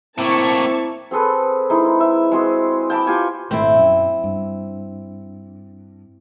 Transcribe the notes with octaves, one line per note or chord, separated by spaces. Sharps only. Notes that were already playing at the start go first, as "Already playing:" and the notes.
A2 A#3 C4 E4 A5 C#6
C4 G#4 A4 B4
G#3 D#4 E4
E5
G#3 C4 F#4 G#4
G5 A5 B5 D6
F4 G4 G#5 C#6
G#1 A#2 A3 C4 E4
F#2
G2